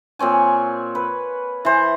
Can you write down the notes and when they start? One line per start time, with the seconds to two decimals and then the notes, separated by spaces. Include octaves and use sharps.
0.19 A#2 C4 C#5 G#5
0.95 B4
1.65 E3 C5